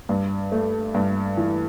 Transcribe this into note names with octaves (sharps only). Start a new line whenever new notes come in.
G2
A3
G2
E3